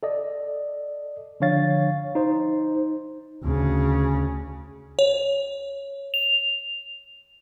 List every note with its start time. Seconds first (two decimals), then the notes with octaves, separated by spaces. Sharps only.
0.03 A4 D5 D#5
1.40 D3 F3 D4 C#5 F5 A6
2.15 D#4 C5
3.44 D2 C#3
4.99 C#5
6.14 F7